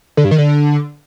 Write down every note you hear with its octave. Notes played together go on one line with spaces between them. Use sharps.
D3
G2
D#3
D3